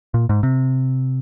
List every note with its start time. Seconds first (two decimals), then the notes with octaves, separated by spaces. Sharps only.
0.14 A#2
0.29 G#2
0.43 C3